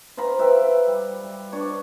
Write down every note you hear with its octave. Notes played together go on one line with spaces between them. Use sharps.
C5 F5 A#5 B5
B4 E5 G5
G3
G3
D4 C#5